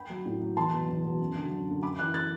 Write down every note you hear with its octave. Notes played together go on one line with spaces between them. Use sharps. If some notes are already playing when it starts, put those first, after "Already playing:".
Already playing: G5 B5
F#3
A2
F#3
E2 A5 C6
B2 F#3
E2
B2 F#3
F#2
D3 F#3
F#2
D3 F#3
F#2 B5 D6
E3 D6 F#6
F#6 A6